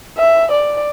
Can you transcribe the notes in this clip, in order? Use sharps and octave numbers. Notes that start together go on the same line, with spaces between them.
E5
D5